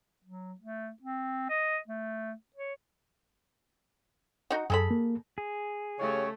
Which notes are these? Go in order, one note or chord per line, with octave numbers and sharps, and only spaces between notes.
F#3
A3
C4
D#5
A3
C#5
D#4 F#4
F#2 G#4 A4 B5
A#3
G#4
C#3 A3 C#4 G4 C#5